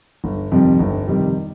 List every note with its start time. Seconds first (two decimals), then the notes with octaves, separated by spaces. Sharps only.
0.24 G1
0.52 F2 C3 D#3 G3
0.79 G1
1.08 F2 C3 D#3 G3